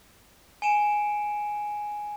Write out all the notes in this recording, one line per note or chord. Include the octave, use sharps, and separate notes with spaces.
G#5 C#7 D7 E7